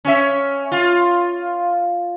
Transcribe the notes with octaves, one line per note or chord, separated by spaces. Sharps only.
C#4 E5
F4